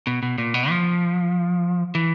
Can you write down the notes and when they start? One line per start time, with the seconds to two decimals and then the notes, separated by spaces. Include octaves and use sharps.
0.07 B2
0.23 B2
0.38 A#2
0.54 B2
0.70 F3
1.95 E3